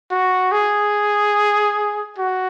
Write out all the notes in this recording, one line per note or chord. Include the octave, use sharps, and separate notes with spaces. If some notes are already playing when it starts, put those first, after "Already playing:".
F#4
G#4
F#4